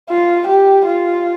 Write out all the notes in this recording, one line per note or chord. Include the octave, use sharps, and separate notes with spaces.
F4
G4
F4